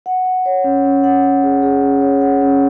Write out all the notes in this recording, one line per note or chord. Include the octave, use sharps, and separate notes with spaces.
F#5
F#5
C#5
C#4
C#4
F#5
F#5
G#4
G#4
C#4
C#5
F#5
C#4